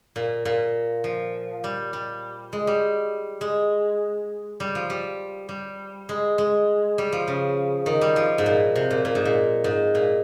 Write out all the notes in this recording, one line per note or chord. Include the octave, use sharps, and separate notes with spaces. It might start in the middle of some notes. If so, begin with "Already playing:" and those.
A#2
A#2
F3
G3
G3
G#3
G3
G#3
G3
F3
G3
G3
G#3
G#3
G3
F3
C#3
D#3
G3
F3
G#2
A#2
C3
A#2
A#2
G#2
A#2
G#2
A#2